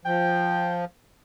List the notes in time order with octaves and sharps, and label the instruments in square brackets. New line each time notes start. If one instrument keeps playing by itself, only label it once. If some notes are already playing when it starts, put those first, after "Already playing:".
[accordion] F3 [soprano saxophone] G5